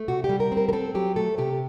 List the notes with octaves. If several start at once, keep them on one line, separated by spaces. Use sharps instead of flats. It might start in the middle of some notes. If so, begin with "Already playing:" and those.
Already playing: A3
C3 F#4
G4
G3
A#4
C4
A#4
A#4
C4 A4
F#3 G4
A3 A4
C3 G4